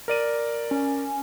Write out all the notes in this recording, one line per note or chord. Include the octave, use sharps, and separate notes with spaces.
A#4 D5 D#7
C#4